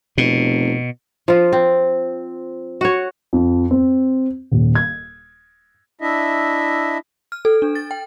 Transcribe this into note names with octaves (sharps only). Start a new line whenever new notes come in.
F1 B2
F3 F4
C4
F#4 C#5
F2
C4
D#1
G#6
D4 E4 D#5 E5
F6
A4
D4
A6
G5